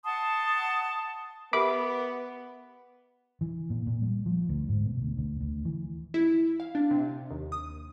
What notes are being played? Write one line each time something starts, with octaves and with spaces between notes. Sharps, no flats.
F#5 A5 C6 D#6
B3 G4 A#4 E5 B5 D6
E3
A#2
A#2
G3
F3
D2
G#2
B2
D2
D2
D2
E3
E4
F5
D4
C3
D#2
D#6